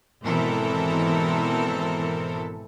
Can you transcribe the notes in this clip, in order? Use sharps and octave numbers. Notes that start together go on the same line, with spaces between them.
G#1 B2 E3 C4 A4 A#4